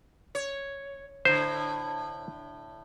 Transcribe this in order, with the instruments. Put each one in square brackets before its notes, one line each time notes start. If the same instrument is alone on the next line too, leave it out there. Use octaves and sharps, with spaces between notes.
[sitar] C#5
[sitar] A2 D3 [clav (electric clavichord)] C5